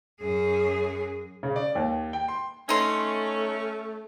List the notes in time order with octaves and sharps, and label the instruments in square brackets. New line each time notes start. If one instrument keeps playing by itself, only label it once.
[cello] F#2 G#4
[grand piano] C#3
D5
D#2
G5
C6
[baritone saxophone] A3 [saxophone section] C#4 [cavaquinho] D#4 C6